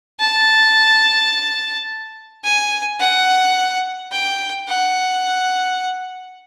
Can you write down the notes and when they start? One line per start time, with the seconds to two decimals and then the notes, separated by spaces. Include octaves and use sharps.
0.20 A5
2.44 G#5
3.00 F#5
4.12 G5
4.68 F#5